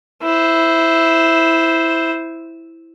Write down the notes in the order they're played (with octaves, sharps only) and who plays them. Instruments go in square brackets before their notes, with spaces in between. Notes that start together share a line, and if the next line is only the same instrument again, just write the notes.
[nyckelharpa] E4 C5